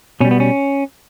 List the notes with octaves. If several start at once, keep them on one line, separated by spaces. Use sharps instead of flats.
B2 G3 C#4
B3
C#4